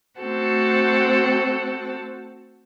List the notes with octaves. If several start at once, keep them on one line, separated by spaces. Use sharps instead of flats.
A3 C4 F#4 A4 F#5